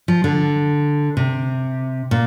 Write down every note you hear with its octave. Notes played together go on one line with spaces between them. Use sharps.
F3
D3
C3
A#2